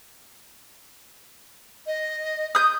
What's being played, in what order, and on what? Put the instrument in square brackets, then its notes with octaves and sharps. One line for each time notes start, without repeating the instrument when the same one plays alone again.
[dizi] D#5
[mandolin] D#6 G6